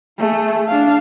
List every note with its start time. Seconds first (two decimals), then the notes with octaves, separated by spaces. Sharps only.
0.18 A3 G#4
0.68 D4 F5